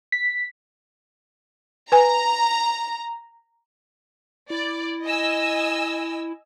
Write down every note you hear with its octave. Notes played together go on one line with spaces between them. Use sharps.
B6
B4 G#5 A#5
E4 D5
D#5 G#5 E6